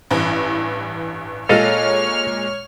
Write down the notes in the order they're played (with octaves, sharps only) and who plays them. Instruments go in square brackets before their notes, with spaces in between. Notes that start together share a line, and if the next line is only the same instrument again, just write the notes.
[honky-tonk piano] A1 G2 E3
[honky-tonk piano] A#2 G#3 F4 [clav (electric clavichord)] A4 D#5 F5 [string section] C#5 F6